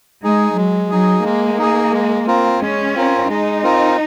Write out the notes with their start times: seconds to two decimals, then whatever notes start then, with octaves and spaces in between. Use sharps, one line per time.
0.23 G#3 D#4 G#4
0.56 F#3 G#3
0.90 F#3 D#4 G#4
1.24 G#3 A#3
1.58 D#4 G#4
1.92 G#3
2.27 C4 F4 A#4
2.60 G#3 C#4
2.94 C4 F4 A#4
3.28 G#3 D#4
3.63 C4 F4 A#4